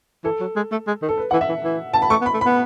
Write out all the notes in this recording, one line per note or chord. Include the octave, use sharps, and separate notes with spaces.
E3 A4
F#3
G#3
A3
G#3
D#3
A4
B4
E3 F#5
E5
E3
E3
A5
B5
A3 C#6
B3
B5
A3
B5
B3